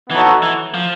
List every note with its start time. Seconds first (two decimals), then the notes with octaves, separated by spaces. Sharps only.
0.10 E3 B3 D#4 F#4 A4 C#5
0.43 E3
0.74 F3